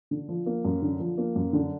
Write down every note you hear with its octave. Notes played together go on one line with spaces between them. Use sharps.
D3
F3
A#3
F#2
D3
F3
A#3
F#2
D3